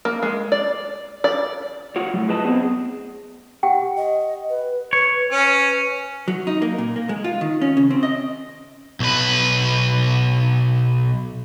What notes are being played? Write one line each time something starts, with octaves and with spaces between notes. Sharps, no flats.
A#3
G#3
D5
D5
F4 F#4 C#5
A2 F#3
G#4 B4 D#5 A5
B3 C4 G#4
G4 F#5 G5
D#5
B4
B4 C#5
C#4 B4
F#3
D#4
A#3
A#2
A#3
G#3
F4
D#3
C#4
C#3
C4
D#5
B1 B4